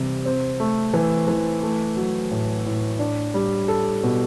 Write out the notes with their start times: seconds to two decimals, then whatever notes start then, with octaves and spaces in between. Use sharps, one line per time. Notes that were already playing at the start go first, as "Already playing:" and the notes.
Already playing: C3 E3 G3 C4
0.25 C4
0.60 A3
0.94 E3
1.28 E3
1.63 A3
1.97 F#3
2.31 A2
2.66 A2
2.99 D4
3.34 G3
3.68 A4
4.03 B2